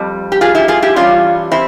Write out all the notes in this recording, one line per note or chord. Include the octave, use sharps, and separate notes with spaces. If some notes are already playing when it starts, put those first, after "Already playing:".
Already playing: F2 G3
G4
F4 G#4
E4 G4
F4 G#4
E4 G4
G2 E3 G3 C#4 F4
C4 E4